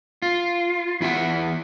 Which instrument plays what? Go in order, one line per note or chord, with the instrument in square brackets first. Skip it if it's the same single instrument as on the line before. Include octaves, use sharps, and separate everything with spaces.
[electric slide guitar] F4
E2 E4 E5 F#5